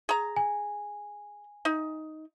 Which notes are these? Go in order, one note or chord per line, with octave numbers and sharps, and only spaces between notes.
G#4 A#5
G#5
D#4